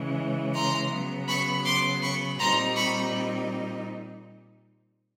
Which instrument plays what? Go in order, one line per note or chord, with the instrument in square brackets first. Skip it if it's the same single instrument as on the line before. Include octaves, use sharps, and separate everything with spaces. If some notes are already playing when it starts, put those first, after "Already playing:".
Already playing: [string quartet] C#3 E3 G#3
A#5 C6
C#3 F#3 B3
B5 C#6
C6 D6
B5 C#6
A#2 G3 C4 D#4 A#5 C6
B5 C#6